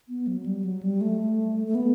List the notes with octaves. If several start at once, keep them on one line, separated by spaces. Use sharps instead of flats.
B3
F#3
G3
F#3
G3
A3
A3
B3